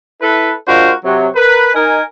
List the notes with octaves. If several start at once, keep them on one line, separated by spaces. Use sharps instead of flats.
E4 A4 B4
G#3 D4 F4 F#4 A#4 C5
C3 F#3
A#4 B4
D#4 A#4 G#5